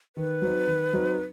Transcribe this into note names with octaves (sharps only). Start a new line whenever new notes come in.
D#3 B4
F#3 C4 D#4
D#3
F#3 C4 D#4